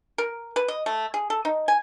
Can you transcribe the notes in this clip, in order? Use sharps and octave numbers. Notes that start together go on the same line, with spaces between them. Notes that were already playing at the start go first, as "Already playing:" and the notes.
A#4
B4
D#5
A3
G#4
A4
D#4
G#5